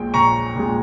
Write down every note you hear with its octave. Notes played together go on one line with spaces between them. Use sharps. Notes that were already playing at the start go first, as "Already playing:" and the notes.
Already playing: A#1 A#2 G#3 G5
A#1 A#5 C#6
A#2 G#3